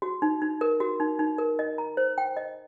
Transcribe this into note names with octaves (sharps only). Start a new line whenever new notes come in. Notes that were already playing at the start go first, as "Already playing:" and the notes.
F#4
D#4
D#4
A#4
F#4
D#4
D#4
A#4
D#5
A#5
C5
G5
D#5